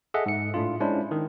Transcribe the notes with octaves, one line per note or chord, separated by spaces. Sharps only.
G#4 A4 D#5 E5 F#5
G#2 C#7
A2 A3 D4 F4
G#3 C#4 D4 E4 C5
D#3